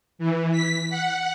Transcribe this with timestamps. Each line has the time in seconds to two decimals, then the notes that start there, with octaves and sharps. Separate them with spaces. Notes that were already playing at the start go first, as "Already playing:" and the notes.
0.19 E3
0.52 B6
0.90 F#5